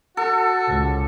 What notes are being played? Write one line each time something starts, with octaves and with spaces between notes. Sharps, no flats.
F#4 A4
C#2